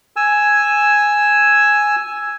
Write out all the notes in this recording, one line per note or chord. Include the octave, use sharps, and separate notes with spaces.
G#5 E6